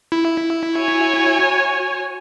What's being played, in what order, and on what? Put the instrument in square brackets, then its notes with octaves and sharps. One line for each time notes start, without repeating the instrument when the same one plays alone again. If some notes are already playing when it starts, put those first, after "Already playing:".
[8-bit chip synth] E4
[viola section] F#4 C#5 G#5